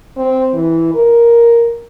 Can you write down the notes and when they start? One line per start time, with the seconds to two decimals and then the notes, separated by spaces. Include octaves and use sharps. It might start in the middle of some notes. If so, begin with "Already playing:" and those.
0.17 C4
0.54 E3
0.94 A#4